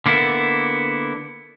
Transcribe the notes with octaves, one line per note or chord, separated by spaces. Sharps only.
D3 A#3 B3 E4